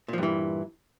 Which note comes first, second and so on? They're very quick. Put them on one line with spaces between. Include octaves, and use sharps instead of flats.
A#2 F3 G2 E3